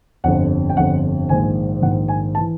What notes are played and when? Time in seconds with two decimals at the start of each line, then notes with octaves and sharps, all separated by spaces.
0.24 G1 F2 D3 F#5
0.70 G5
0.76 G1 F2 D3 F#5
1.29 A#1 G#2 D#3 G#5
1.82 A#1 G#2 D#3 F#5
2.08 G#5
2.35 A5
2.38 E3